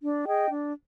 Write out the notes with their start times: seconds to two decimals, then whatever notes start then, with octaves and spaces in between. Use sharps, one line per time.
0.02 D4
0.25 G#4 D#5 G5
0.49 D4